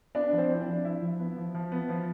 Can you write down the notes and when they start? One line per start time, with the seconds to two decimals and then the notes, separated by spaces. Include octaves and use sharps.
0.15 B3 D4 D5
0.32 F3
0.38 C4 C5
0.50 E4
0.61 D4 D5
0.68 F3
0.85 F3 E4 E5
1.02 F3
1.19 B3
1.37 F3
1.55 F3
1.72 B3
1.89 F3